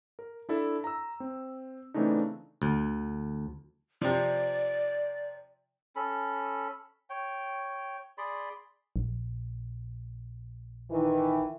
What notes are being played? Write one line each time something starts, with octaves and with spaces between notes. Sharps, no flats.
A#4
D4 E4 A4 E5
A#5 E6
C4
C#3 E3 A3 C4 D4 D#4
D2
C3 F3 D5
C#4 A4 B5
C#5 G5
G#4 D5 B5 C6
A#1
D#3 E3